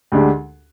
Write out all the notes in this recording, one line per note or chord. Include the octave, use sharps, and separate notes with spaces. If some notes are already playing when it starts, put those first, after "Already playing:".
D2 D3 G#3 D4 G4